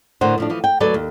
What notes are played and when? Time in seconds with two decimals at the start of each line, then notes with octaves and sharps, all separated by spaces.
0.21 A2 D3 A#4 C5 F#5
0.38 A2 F3 D4
0.50 E3 F3
0.64 G5
0.80 D2 F#3 A4 B4 D5
0.94 D#2